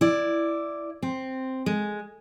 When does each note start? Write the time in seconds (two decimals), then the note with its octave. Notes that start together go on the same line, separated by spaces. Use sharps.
0.01 E4 D5
1.02 C4
1.66 G#3